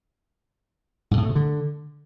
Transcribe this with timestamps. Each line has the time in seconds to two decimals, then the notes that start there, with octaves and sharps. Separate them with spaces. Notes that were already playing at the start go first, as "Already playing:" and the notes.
1.11 G#2
1.17 A2
1.23 A3
1.29 C3
1.35 D3